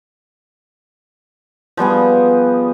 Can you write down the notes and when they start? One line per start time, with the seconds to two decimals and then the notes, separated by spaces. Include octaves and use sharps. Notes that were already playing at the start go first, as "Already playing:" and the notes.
1.77 F3 G3 B3 G#4